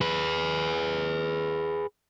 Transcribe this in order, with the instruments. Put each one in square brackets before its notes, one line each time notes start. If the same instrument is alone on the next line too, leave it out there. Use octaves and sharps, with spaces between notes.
[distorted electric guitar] G#4 B4